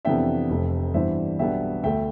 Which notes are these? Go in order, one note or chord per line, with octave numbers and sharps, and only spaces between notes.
F2 C3 E3 B3 D4 E5 G5
F1 F2 C3
G2 E3 B3 D4 C5 E5
B1 B2 G3 B3 D4 E5 G5
D2 D3 A3 E5 G5